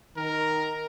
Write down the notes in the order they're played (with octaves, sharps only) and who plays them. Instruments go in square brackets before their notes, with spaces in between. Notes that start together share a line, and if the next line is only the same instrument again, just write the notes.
[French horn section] D#3 [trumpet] A#4